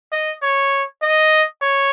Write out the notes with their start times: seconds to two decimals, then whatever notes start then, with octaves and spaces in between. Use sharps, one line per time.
0.12 D#5
0.42 C#5
1.02 D#5
1.62 C#5